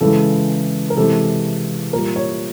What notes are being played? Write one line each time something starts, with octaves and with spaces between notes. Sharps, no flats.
C#3 E3 G#3 A4
A#4
C3 E3 G#3 A4
A#2 G3 A#4
C#5